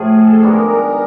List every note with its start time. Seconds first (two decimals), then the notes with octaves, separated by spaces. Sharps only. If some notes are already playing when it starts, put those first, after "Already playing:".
Already playing: A2 F3 A3 G#4
0.14 A4
0.42 D#3 G#3 B3 D4 A#4